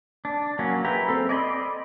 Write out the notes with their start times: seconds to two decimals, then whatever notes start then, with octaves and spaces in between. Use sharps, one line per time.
0.25 D4
0.59 F#3 A#3 C#4
0.85 G#4 B4 E5 G5 A#5
1.08 C4 A4
1.29 D5 D#5 G#5 B5 C6